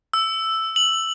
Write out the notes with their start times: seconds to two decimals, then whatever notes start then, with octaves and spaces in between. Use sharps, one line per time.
0.14 E6
0.76 F#7